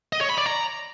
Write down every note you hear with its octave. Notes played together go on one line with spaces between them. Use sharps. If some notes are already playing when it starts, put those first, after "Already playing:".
D#5
C#5
B5
D5
A#5